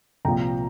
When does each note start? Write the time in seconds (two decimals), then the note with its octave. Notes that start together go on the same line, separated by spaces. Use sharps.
0.25 C2 A#2 F3 G5 A#5